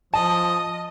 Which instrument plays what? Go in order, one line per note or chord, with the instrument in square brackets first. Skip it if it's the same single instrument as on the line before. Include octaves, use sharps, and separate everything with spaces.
[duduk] F3 [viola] D#5 [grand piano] A5